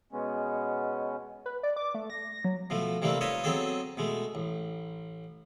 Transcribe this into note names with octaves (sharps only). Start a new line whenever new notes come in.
B2 G#3 B3 C#4
B4
D5
D6
A3
A#6
F#3
B2 F3 A3
C3 E3 G3 A3 A#3 C4
D#4 F4 B4 C#5 D#5 E5
F#3 B3 C4 G#4 A4 D#5
B2 G#3 A3
A1